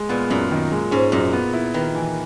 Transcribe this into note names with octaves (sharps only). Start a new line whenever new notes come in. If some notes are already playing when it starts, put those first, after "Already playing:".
Already playing: G#3
A#2 B3
F#2 A#2
D#3
G#3
G#2 C#4
F#2 A#2
B3
E4
D#3 B4
E3